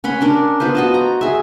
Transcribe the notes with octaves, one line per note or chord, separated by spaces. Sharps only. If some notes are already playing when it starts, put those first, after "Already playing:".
C#4 F#5 B5 C6
C#4 D4 A#4
B3 F4 B4 C5
F#4 D#5 A5
A#5
G#4 E5